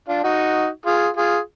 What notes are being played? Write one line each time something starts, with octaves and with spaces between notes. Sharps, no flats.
D4 F4
D#4 F#4
F4 G#4
F4 G#4